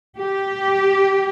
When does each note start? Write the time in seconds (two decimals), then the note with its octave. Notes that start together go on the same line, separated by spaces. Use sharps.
0.17 G4